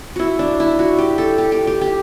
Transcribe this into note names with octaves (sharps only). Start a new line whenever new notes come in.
E4 F#4
D4
E4
F#4
G4
A4
G4
G4
G4
G4